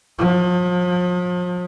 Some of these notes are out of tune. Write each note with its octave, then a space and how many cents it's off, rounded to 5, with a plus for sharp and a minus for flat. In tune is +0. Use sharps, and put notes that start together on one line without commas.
F3 +40